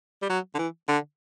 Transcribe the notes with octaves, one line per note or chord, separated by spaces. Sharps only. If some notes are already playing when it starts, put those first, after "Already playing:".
G3
F#3
D3
E3
D3